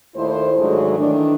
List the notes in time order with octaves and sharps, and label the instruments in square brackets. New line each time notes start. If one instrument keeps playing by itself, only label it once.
[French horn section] D#2 A#2 A3 E4 C5
G#2 D3 D#3 F#3 G#3 A3
D#3 E3 A3 D4